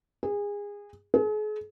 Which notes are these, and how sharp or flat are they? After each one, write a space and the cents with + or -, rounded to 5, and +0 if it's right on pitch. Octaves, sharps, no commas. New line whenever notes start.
G#4 -25
G#4 +40